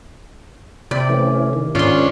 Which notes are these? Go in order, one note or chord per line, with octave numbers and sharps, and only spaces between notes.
C3 D5 G5 B5
E3 A3 C#4
D#3
G#2 C#4 D4 F4 C6